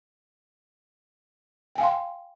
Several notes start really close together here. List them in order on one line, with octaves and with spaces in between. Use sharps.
G5 G#5 F5 C6